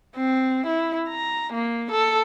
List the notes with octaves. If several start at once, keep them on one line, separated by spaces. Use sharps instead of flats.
C4
E4
A#5
A#3
A4